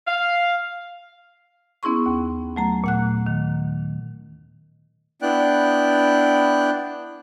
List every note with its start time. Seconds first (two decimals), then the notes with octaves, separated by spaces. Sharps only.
0.07 F5
1.83 B3 C#4 E4 G#4 C6 C#6
2.06 D#2
2.56 F#3 A3 A#5
2.84 A#2 F#5 F#6
3.27 D#3
5.22 B3 D4 E4 D5 G5 F#6